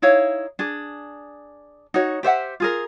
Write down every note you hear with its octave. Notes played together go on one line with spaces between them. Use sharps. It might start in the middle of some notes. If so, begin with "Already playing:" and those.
D#4 E4 C#5 F5
D4 G#4
D#4 F#4 C#5
G4 C5 E5 F#5
F4 G#4 A#4